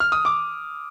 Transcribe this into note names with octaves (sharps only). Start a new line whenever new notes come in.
F6
D#6
D6